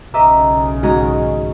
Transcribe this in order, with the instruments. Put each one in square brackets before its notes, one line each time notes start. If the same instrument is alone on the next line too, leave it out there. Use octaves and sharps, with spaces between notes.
[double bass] B1 C#3 [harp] D#5 E5 D6 [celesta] A#5
[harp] G#2 D#3 A#5 [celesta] F#4